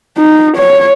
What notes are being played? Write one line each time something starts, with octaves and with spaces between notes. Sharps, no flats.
D#4
C#5